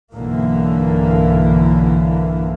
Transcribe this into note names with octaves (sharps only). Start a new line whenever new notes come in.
B1 G2 D3 E3 A#3